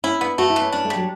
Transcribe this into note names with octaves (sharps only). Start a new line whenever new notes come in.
C#4 E4
B3 D4
A3 F#4
E4
E3
C#4
C#4 D4
A3
G3
F#3